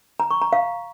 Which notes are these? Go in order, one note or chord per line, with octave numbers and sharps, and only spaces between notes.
A#5
C#6
A#5
F5